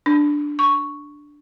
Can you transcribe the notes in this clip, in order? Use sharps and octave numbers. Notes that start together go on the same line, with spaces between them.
D4
C#6